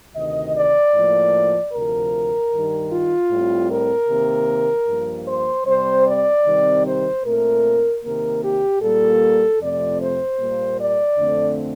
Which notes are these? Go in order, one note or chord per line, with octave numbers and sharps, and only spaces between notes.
D2 C3 D#3 D#5
D5
A2 F3 A#3
D2 C3 F3 A#4
G2 D#3 G3
F4
A2 G3 C4
A#4
C3 D#3 A#3
G2 F3 A#3
C5
C3 G3 C4 C5
D5
C3 D#3 G3 C4
C5
A#2 A3 C4 A#4
C3 D#3 A#3 A#4
G4
A#2 G3 A#3 A4
F2 C3 F3 A3 C4 D5
C5
A#2 G3 A#3
D5
F2 D3 A3 C4